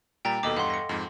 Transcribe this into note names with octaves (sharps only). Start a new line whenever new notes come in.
A#2 G3 G5 A#5 A6
D#2 B2 A4 D#5 D6
E2 G2 F5 F#5 C6
A#6 C#7
F2 G#2